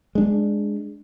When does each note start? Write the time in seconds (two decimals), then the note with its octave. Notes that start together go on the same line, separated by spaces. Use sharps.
0.15 G#3 D4